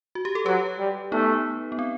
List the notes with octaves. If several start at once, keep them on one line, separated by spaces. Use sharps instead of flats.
F#4
G4
A4
F#3 G4 B4
G3
A3 B3 D#4
B3
C4